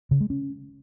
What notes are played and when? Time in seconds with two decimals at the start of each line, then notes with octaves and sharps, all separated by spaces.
0.11 C#3
0.21 G#3
0.30 C#4